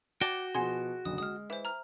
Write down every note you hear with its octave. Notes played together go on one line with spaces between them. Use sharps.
F#4 D5 G5 A5
B2 F3 G#4 F#5 C6
F#1 B1 D3 D#6
G#3 D#6 F6
E3 C5 E5
A#5 F6